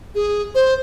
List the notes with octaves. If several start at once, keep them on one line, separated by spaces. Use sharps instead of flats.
G#4
C5